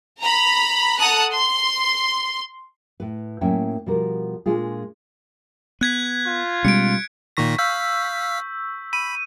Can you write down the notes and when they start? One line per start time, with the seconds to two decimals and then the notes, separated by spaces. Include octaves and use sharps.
0.21 A#5 B5
0.99 A4 F#5 A5 A#5 D#6 F#6
1.33 C6
3.00 A2 B4
3.41 A2 F#3 A#3 C#4 E5 G5
3.86 B2 F3 G3 F#4 A#4
4.46 A#2 G#3 D4 F4 G#4
5.81 B3 F#6 G#6 B6
6.26 F4
6.65 B2 G3 G#3 C#4 C#7 D7
7.37 A#2 D#3 C#6 A#6 B6
7.58 F5 E6 G6 B6
8.93 B5 D#7